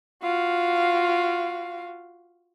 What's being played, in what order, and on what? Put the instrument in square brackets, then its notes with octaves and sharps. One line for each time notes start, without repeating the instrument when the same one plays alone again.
[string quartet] F4 F#4 F5